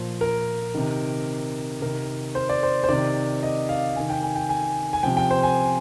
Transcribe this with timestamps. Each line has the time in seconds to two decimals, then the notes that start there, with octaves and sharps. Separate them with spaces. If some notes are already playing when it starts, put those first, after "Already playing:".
Already playing: A#2 F3 C5
0.21 A#4
0.75 C3 D#3
1.81 C3 D#3 A#4
2.35 C5
2.49 D5
2.63 C5
2.84 C5
2.89 C3 D#3 D5
3.43 D#5
3.69 F5
3.96 C3 D#3 G#5
4.10 G5
4.23 G#5
4.36 G5
4.49 G#5
4.93 G#5
5.03 C3 F3 G5
5.17 G5
5.31 C5
5.43 G#5